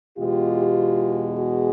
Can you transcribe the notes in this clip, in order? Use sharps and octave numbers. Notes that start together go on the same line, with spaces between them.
E2 B2 G#3 F4 G4
F#4 G#4